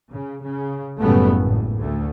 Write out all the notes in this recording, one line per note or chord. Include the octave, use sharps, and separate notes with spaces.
C#3
C#3
F#1 A2 C#3 G3 A3 B3
G#1 A2
D2 A3